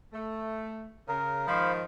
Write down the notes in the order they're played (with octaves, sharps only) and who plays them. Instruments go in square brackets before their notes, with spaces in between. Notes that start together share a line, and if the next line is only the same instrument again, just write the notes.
[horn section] A3
[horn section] C#3 [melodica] A#4
[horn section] G#2 D#3 F3 [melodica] C5 F5 B5